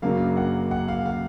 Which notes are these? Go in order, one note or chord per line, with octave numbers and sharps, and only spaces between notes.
F#2 C#3 F#3 A#3 D4 F5
F#5
F#5
F5
F5